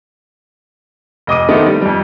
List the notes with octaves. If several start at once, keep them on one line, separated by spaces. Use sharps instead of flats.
F1 D#5 D6 D#7
D#3 A3 B3 C4 D#4
G3
F2 G3